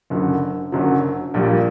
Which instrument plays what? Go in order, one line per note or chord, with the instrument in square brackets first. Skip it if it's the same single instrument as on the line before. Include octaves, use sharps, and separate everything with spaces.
[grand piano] F#1 F#2 D3 F#3
F#1 F#2 D3 F#3
A#1 A#2 G3